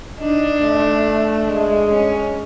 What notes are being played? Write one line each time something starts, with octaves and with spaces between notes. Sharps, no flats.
D4 D#4
A3
G#3
C#4